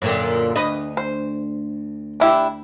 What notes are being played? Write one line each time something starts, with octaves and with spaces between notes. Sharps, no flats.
F#2 A#2 D3
D2 B4 D#5
C5
D4 E4 G4